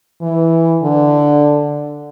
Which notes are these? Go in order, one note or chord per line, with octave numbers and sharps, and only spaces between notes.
E3
D3